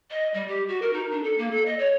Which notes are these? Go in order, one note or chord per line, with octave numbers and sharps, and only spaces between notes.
D#5
G3
G4
F#4
A#4
D#4
D4
A4
A#3
A4
D#5
C#5